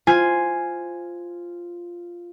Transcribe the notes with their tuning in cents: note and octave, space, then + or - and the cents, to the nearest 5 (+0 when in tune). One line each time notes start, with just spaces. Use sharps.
F4 -5 C5 +0 G#5 +0